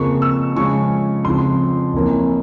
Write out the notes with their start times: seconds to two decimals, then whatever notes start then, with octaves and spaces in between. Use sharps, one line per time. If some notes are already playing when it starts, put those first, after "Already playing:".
Already playing: F2 C#3 F3 A#3 C#6
0.22 E6
0.56 C#3 F3 G#3 C#4 C#6
1.25 F2 C#3 F3 C6
1.94 F2 E3 A#3 C#4